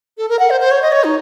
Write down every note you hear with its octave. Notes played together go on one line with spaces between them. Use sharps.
A4
A#4
F#5
C5
C5
C#5
D#5
C#5
D#4